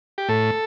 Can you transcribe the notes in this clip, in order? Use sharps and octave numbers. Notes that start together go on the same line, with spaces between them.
G4
A2 A4